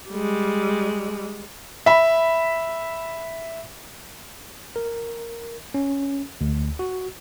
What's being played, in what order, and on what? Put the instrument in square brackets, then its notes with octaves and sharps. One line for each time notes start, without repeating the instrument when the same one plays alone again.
[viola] G3 G#3
[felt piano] E5 B5
[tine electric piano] A#4
C#4
D2
F#4